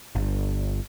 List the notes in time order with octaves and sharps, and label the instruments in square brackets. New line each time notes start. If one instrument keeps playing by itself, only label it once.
[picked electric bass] G1